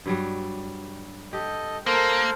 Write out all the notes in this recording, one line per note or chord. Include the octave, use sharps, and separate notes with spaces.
G2 F#3 G3
G4 A4 D#5
A#3 A4 A#4 C5